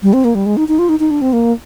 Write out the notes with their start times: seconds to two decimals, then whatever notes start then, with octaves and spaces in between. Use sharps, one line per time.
0.03 G3
0.13 C4
0.24 A#3
0.35 G3
0.46 G#3
0.57 D#4
0.68 D#4
0.79 F4
0.89 D#4
1.00 D#4
1.11 D4
1.21 C4
1.33 A#3